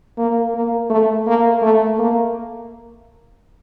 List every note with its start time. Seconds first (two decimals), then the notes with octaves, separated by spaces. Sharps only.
0.18 A#3
0.54 A#3
0.90 A3
1.27 A#3
1.62 A3
1.99 A#3